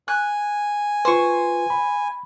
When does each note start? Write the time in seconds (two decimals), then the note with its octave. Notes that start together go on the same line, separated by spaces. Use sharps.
0.08 G#5 F#6
1.05 F4 B4 C5 C#6
1.70 B5